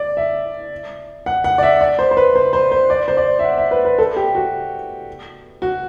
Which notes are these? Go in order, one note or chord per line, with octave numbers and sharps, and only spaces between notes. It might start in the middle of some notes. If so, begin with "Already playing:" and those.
Already playing: D5
E5
F#5
F#5
D5
E5
D5
C5
C5
B4
C5
C5
C5
D5
C5
D5
E5
F#5
E5
B4
B4
A4
G4
F#4
F#4